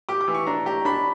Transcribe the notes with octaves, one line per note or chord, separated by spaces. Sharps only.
G4 D6
D6
E3
C#6
D4 A#5
G4 A#5
D4 B5